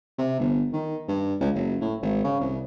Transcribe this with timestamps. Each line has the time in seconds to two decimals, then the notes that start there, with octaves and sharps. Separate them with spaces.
0.18 C3
0.39 G1
0.73 D#3
1.08 G2
1.40 C#2
1.55 F#1
1.81 A2
2.02 G#1
2.24 C#3
2.40 C2